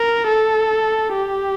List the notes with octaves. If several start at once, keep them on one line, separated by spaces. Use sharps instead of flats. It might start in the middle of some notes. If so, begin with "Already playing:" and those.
Already playing: A#4
A4
G4